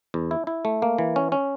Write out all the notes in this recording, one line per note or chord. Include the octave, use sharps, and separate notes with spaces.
E2
E4
E4
A3
A#3
E3
C#4
C#4